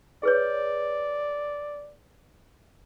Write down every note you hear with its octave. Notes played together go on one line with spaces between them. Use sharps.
G#4 B4 C#5 D5